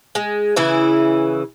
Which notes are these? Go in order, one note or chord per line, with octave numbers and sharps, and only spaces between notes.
G#3
C#3 E3 E4